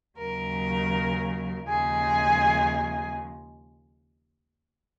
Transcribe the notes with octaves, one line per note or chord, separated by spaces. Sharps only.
D#2 C#3 F#3 A#4
D#2 C#3 F3 G#3 G#4